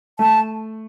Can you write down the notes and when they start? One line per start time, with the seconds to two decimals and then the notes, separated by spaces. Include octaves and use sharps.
0.19 A3 A5